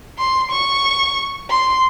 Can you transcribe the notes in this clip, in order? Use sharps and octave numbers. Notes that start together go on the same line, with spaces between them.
C6
C#6
C6